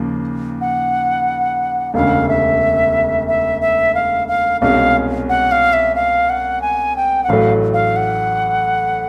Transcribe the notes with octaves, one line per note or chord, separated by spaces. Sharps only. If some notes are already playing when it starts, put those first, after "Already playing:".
Already playing: D#2 C#3 F3 A#3
F#5
E1 D2 C#3 F5
E5
E5
E5
F5
F5
C2 B2 G#3 C#4 F5
F#5
F5
E5
F5
F#5
G#5
G5
F#5
A1 A2 F#3 A3 F5
F5
F#5